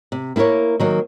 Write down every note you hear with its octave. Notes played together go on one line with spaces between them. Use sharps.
C3
A#3 E4 F#4 A#4 C#5
D#3 F#3 A#3